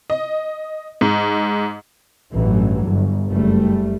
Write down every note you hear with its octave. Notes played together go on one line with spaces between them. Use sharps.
D#5
G#2
A1 G2 E3 F#3
G1
F#1 G3 A3